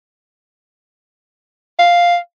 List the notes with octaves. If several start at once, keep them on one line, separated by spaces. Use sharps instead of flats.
F5